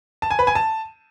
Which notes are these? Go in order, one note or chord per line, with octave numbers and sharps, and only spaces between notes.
A5
G#5
B4
G#5
A5